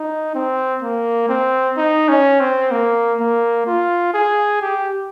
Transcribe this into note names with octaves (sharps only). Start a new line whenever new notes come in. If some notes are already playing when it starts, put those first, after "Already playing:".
Already playing: D#4
C4
A#3
C4
D#4
C#4
C4
A#3
A#3
F4
G#4
G4